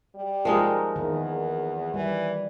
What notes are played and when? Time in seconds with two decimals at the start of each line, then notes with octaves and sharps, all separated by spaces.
0.15 G3
0.45 F3 G#3 D#4 A#4
0.96 E2 D#3
1.94 E3 G3